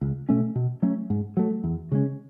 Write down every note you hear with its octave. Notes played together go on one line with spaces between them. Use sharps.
C#2
B2 A3 C#4
B2
F#3 A3 C#4
G#2
F#3 A3
E2
C#3 G#3 C#4